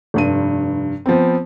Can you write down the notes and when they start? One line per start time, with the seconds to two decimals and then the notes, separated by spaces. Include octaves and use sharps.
0.14 F1 G2 D#7
1.06 F3 B3 C4